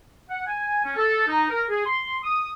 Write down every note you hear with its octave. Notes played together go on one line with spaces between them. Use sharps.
F#5
G#5
C#4
A4
D#4
A#4
G#4
C6
D#6